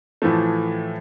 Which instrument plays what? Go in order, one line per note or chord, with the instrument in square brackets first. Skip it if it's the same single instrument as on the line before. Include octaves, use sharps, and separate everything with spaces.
[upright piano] A2 E3 F3 A3